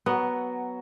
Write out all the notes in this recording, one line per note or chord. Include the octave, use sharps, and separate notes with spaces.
F#3 B3